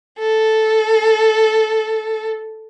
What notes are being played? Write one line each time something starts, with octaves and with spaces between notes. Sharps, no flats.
A4